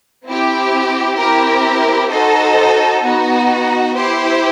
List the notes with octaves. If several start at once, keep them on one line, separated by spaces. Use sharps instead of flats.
C4 E4 G4
C4 E4 G4 A#4
D#4 F#4 A4 C5 D#5
B3 D#4 F#4
E4 G4 C5